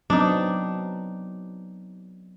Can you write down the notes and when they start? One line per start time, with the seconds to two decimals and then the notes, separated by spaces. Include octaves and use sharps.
0.10 F#3 B3 C4 D4 D#4